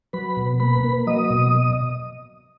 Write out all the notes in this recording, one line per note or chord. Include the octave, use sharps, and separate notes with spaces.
F#3 B4 B5
B2
A#3 B4 B5
A#3
F#3 D#5 D#6
B2